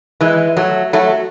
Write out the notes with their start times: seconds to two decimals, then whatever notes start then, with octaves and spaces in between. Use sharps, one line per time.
0.21 E3 G#3
0.57 F#3 A3
0.93 F#3 A3